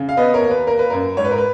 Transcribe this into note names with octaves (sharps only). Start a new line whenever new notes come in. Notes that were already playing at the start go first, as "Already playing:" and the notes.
Already playing: C#3
F5
B3 B4 D#5
A#4 C#5
D#2
B4
A#3 A#4
B4
F#2 A#4
G#2 C#5
B4
A#4
B4